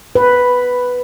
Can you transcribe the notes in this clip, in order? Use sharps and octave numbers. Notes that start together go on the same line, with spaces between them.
B4